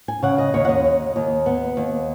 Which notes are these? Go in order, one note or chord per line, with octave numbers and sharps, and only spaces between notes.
G#5
C#3 F#5
D#5
D#2 C#5
F#5
D#5
D#2
D#2
B3
D#2